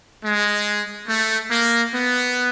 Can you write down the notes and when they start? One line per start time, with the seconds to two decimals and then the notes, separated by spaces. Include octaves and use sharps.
0.22 G#3
1.07 A3
1.50 A#3
1.92 B3